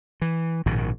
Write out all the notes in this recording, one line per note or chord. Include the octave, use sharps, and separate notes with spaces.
E3
A#1 G#2 B2 D#3